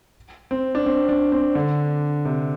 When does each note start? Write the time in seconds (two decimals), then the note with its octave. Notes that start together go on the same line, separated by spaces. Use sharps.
0.51 C4
0.75 D4
0.86 C4
1.09 D4
1.32 C4
1.55 D3
2.25 C3